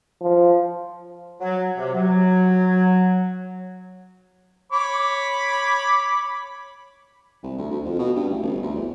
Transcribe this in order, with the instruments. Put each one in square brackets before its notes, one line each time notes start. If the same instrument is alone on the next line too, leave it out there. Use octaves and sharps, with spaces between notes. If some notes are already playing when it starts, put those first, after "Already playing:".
[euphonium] F3
[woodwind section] F#3
C3
F#3
[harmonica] C#5 B5 D6
[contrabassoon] C2
D2
D2
F2
B2
G2
A1
G1
D2
E2